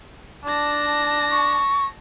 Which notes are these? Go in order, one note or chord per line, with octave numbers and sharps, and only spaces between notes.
D4 A5 A#6
C#6